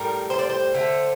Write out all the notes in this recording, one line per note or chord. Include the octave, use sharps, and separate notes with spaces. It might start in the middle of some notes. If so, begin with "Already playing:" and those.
Already playing: A2 G3 A#4
C5
D5
C5
D3 A3